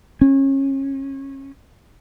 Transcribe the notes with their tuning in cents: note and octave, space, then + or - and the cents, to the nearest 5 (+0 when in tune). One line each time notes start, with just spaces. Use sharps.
C#4 -25